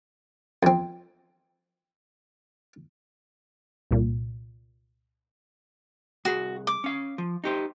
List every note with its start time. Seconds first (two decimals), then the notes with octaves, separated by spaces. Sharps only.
0.63 F2 C4
3.91 C2 A#2
6.25 C2 F#4 G#4
6.67 D6
6.84 C#4 F5
7.18 F3
7.44 D#4 G4 C5